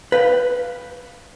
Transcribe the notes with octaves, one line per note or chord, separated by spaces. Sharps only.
B4 F5 G5